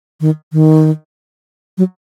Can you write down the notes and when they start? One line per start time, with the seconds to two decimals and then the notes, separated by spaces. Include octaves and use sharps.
0.21 D#3
0.53 D#3
1.78 F#3